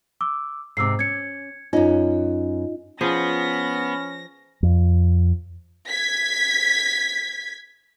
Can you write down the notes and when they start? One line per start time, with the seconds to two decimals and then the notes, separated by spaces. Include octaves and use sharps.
0.21 D6 E6
0.77 G#2 C3 D6 E6 C7
0.99 C#4 G#6 C#7
1.73 F#2 C#4 D#4 F4 D#5
3.01 F3 B3 C#4 G#4 A#6
4.63 F2
5.89 G#6 B6